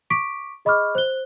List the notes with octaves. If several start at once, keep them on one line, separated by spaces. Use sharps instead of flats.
C#6 D6 B6 D7
G#4 D#5 B5 C#6 D6 F6
C5 F#6 G7